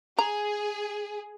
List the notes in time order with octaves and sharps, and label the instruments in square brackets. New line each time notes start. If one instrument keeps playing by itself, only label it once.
[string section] G#4 [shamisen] A#5